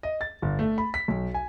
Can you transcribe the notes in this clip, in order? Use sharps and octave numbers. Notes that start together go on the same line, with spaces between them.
D#5
A6
G1
A3
B5
B6
B1
G#5